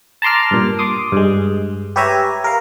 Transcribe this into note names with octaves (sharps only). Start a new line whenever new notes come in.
A5 A#5 C6 D6 F6
G2 A#2
C6 D6 D#6
G2 G#3
G4 B4 C#5 E5 G#5 A#5
A#4 F5